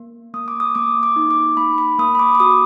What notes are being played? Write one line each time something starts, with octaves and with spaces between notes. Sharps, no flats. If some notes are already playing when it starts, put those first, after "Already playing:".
Already playing: A#3
A#3 D#6
D6
D#6
A#3 D6
D6
D#4
D6
A#3 B5
B5
A#3 D#6
B5
D6
D6
F#4 D#6